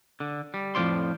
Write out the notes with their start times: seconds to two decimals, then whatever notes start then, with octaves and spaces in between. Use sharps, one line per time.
0.20 D3
0.54 G3
0.75 F2 A2 E3 F3 D5 C6